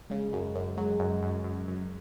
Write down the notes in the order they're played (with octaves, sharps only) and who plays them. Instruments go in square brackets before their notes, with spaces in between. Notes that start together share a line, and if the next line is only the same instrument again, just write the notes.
[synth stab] C#3 [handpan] G#3
[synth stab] F#2
F#2
[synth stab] F#3 [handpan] G#3
[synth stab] F#2
F#2
F#2
F#2